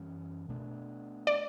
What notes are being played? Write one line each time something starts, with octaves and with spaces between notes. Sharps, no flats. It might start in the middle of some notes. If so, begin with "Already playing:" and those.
Already playing: F#2 E3 G3 C#4
B2 A3 D4
D5